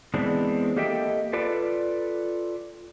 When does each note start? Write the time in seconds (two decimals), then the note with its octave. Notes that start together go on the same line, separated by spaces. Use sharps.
0.14 E3 G#3 B3 C4 D4
0.76 A#3 G4 A4 D#5 E5 G5
1.33 F4 A4 B4 D5